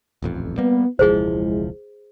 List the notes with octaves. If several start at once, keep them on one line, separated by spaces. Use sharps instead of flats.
D#1 A1 F2
G3 A#3 B3
E1 C#2 F3 G#3 E4 G#4 C5